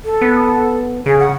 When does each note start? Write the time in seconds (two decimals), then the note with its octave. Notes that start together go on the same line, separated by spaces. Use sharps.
0.05 A4
0.21 B3
1.06 C#3 G#4
1.20 F#5